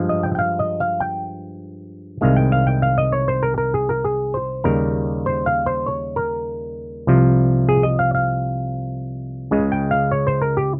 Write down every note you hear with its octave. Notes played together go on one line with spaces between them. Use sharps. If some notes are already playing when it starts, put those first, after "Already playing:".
Already playing: G2 F3 G#3
D#5
G5
G5
F5
D#5
F5
G5
C2 C3 D#3 G#3 F5
G5
F5
G5
F5
D#5
C#5
C5
A#4
A#4
G#4
A#4
G#4
C5
D#2 C#3 G3 A#4
C5
F5
C5
C#5
A#4
C2 C3 F3
G#4
D#5
F5
F5
C#2 C#3 G#3
G5
F5
C#5
C5
A#4
G4